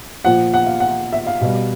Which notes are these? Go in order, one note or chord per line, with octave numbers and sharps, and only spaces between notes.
A#2 F3 F#5
F#5
F5
F#5
E5
F5
B2 G3